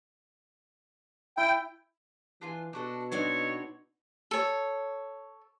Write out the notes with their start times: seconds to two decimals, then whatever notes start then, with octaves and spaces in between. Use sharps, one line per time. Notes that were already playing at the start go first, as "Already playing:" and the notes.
1.37 E4 G5
2.41 E3 D4 F4 G#5
2.73 B2 D4 F#4 A4
3.12 B3 C4 D4 D#4 F#4 C#5
4.31 A4 C#5